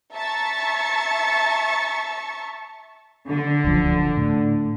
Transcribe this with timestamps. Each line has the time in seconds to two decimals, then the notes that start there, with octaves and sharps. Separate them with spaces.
0.14 E5 A5 A#5 C#6 A6 C#7
3.30 D3
3.64 D1 C#2 F3
4.17 A2